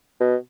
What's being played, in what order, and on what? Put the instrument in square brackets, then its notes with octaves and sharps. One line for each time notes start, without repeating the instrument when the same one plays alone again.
[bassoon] B2